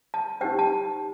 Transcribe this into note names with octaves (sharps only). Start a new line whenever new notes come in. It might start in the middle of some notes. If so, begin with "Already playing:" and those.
A5
D#4 G4 C5 G5
A5